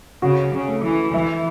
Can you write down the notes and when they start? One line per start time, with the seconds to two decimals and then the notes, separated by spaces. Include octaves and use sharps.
0.22 C#3 F#4
0.54 C#3
0.68 A3
0.83 E3
1.14 E3 E5